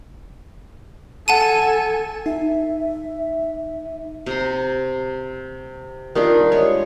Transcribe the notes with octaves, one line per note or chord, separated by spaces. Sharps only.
A4 F#5 G#5 A5 D#7
D#4 E5
C3 A#5 C6
D#3 G3 D4 F4
G#3 C#5